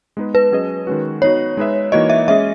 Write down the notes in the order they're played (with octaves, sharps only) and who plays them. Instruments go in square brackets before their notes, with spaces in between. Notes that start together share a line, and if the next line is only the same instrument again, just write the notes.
[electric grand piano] G#3 B3 D#4 G#4 B4
[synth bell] B4
[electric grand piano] F#3 C#4 G#4 D#5
D#3 G#3 C#4 F#4
[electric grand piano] B3 D#4 F#4 [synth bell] C#5
[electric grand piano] G#3 D#4 G#4 B4 E5
[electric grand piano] E3 A#3 D#4 F#4 C#5 [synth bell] D#5
[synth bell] E5
[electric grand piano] G#3 C#4 G#4 D#5 [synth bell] E5